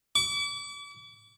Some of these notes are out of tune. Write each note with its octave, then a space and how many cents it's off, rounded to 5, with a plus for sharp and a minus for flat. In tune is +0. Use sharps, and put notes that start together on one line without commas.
D6 -40